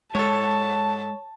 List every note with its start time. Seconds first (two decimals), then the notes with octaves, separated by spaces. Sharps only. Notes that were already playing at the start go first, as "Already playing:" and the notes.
0.15 G#2 G#3 A4 C#5 A5